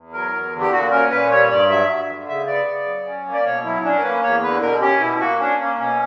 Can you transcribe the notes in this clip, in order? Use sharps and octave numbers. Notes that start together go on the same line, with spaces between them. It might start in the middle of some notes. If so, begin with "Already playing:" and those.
Already playing: E2
F#3 A#4
E2
D3
G4
A#2 F#4
C#4 A#4
A#2 B4
G3 C#5
G2 D5
F#3 E5
G2
D3
C#3 E5
B3 D5
C#3
F#3
C#4
A#3
D5
B2 C#5
F#3 E4
C#4 D4
A#4
A#3 B4
E2 C#5
D3 B4
B2 A#4
C#4 G4
B2 E4
A#3 F#4
C#4 D4
A#3 C#4
B2 C#4